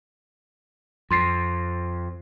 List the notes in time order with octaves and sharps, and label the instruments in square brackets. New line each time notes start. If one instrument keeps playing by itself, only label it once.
[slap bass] F2 [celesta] C6 A6 C7